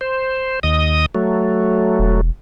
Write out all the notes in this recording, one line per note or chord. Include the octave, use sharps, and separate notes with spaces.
C5
D#2 D#5 D#6
F#3 A3
E1